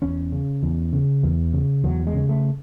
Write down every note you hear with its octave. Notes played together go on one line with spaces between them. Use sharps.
E2 C#4
C#3
E2
C#3
E2
C#3
E2 F#3
G#3
C#3
A3